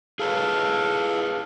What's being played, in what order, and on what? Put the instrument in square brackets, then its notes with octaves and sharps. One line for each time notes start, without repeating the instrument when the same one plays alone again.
[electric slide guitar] G#4 B4 C#5 [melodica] A4 F5